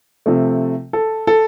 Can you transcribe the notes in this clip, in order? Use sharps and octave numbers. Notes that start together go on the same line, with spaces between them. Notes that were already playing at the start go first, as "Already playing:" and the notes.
C3 F3 A3
A4
A4